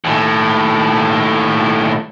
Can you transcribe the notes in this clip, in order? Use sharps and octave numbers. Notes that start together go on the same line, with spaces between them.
D#2 A2